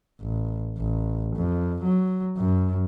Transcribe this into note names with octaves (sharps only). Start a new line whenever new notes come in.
A1
A1
F2
F#3
F#2